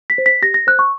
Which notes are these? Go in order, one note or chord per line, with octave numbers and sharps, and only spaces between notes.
B6
C5
B6
G4 A#6
A#6
C5 F#6
C#6